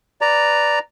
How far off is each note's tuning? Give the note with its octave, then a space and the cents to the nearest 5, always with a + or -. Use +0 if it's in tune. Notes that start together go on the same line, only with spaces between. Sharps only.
B4 +0 D5 +0 A#5 -5